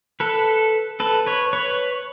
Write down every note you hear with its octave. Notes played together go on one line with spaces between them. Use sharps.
A4 B4
A4 B4
B4 C#5
B4 C#5